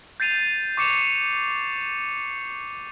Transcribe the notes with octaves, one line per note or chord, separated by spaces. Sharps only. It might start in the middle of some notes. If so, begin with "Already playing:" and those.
G6 A6 C7 D#7 F7
C#6 D6 C7 C#7 E7 F7